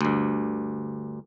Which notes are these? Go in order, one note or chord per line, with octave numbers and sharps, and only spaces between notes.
D2 G2